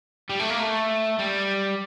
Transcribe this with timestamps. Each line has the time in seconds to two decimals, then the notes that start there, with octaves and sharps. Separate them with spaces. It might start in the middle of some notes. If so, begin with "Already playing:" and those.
0.29 G3
0.39 A3
0.49 A#3
0.59 A3
1.19 G3